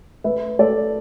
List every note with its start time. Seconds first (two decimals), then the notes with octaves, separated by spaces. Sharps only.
0.24 A3 B4 E5
0.59 A3 A4 D5